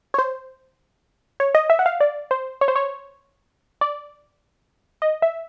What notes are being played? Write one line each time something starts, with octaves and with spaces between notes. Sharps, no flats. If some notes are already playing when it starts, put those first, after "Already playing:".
C#5
C5
C#5
D#5
E5
F#5
F5
D5
C5
C#5
C5
C#5
D5
D#5
E5